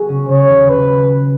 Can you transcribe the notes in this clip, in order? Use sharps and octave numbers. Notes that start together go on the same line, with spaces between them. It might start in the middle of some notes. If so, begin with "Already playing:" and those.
Already playing: F#3 B3 D#4 F#4 G#4
C#3 C#4
C#3 C#5
D#2 D#3
C#3 B4